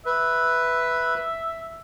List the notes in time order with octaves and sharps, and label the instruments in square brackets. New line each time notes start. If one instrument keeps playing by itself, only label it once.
[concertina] B4 [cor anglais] E5